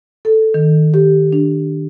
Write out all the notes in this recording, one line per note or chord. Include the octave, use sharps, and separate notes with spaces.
A4
D#3
G4
D4